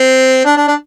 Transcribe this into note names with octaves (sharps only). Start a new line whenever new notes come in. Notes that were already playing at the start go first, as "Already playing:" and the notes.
Already playing: C4
D4
D4
D4